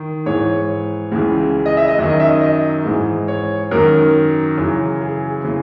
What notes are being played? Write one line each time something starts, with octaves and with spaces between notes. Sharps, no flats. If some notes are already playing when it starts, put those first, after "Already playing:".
Already playing: D#3
G#2 E3 C#5
C#2 C#3 E3
D#5
E5
D#5
F#2 D#3
D#5
E5
D#5
D#5
G#2 E3
C#5
F#2 D#3 A#4
F#2 C#3 E3
G#4
C#3 E3